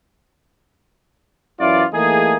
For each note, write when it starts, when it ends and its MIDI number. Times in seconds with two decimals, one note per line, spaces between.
1.60 1.85 42
1.60 1.85 52
1.60 1.85 64
1.60 1.85 65
1.60 1.85 74
1.94 2.37 52
1.94 2.37 57
1.94 2.37 58
1.94 2.37 63
1.94 2.37 68